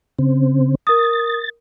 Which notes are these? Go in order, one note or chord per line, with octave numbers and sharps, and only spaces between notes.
C#3 C4
A#4 D#6 A6